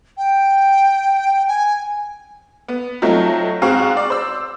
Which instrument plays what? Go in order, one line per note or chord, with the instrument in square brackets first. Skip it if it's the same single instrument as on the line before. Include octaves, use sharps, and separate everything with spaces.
[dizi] G5
G#5
[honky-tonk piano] B3
F#3 A3 C4 D#4 F4
G#2 C4 F#4 F5 A#5 C#6
D5
C5 E6